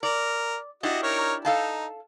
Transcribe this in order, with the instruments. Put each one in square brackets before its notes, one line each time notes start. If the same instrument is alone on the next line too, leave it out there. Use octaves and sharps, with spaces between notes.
[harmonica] A#4 [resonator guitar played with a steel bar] D5
[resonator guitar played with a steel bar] D4 E4 G4 [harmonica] F#4 D#5
[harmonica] D#4 A#4 C#5
[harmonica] D#4 [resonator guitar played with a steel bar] A4 F5 A5